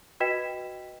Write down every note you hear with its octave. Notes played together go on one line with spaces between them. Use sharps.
F#4 B4 D#5 G5 B6 E7